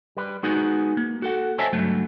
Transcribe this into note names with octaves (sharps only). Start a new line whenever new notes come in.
G3 B4
G#3 B3 D#4 F#4 G#4
A#3
F#4 A4 F#5
C5 C#5 D#5 E5 G#5 A5
C#2 G2 F#3 A3